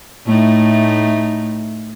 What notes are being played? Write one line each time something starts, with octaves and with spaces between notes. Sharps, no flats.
A2 A3 D#4